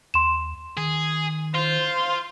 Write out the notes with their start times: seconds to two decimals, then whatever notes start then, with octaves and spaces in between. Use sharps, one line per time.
0.14 D#2 C6 E7
0.77 D#3 G#4
1.55 F4 C5